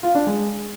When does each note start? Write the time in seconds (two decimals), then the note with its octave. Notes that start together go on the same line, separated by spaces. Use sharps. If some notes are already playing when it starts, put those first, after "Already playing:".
0.03 F4
0.15 D4
0.27 G#3